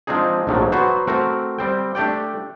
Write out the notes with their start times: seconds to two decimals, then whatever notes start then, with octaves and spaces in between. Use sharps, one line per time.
0.07 F3 G#3 C4 D4 D#4 G#4
0.47 A#1 G#2 F3 F#3 G#3 A3
0.72 F#3 B3 F#4 C5
1.07 A3 C4 F#4 A#4
1.58 G3 C4 G5
1.95 A3 D4 G4 D5 G5